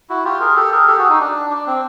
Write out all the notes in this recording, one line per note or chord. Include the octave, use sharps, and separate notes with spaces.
E4 F#4
F4 G4
G#4 A#4
G4 A4
G#4 A#4
G4 A4
F#4 G#4
D#4
D4
D4
C4